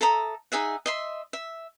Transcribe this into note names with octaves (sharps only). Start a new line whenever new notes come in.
A4 E5 A#5 D#6
D#4 G#4 E5 F#5
D#5 E5 C6
E5